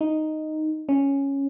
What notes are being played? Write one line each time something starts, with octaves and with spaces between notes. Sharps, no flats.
D#4
C#4